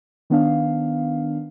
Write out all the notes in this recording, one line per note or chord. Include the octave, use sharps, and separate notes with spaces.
D#3 B3 D4 F5